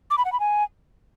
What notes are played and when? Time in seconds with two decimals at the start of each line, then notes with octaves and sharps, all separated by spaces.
0.10 D6
0.18 B5
0.25 F#5
0.32 B5
0.40 G#5